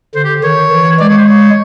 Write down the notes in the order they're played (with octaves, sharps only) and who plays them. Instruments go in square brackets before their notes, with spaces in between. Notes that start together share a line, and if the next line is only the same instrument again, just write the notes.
[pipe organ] D3 [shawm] C5
[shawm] G4
[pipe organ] D#3 [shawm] C#5
[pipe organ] E3
[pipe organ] G#3 [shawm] D5
[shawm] C#5
C5
C#5